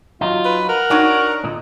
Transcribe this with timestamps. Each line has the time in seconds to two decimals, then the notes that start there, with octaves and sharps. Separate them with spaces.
0.21 F#3 D#4 F4
0.45 B4
0.69 A#4 F#5
0.90 D4 D#4 F#4 C#5
1.44 A#2 D3 D#4